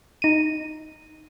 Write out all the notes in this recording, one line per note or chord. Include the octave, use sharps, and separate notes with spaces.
D#4 D#7